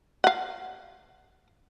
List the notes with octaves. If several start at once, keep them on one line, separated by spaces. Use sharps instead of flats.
F5 F#5